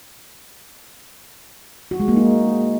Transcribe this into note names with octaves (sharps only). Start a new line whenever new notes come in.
F#4
G#3
A#3
D#4